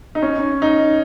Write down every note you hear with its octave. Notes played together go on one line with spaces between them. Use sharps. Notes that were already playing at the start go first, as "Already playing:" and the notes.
D#4
C#4
D#4